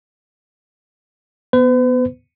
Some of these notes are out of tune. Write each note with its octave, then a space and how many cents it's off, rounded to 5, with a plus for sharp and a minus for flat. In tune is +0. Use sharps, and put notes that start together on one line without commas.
B3 +0 B4 +45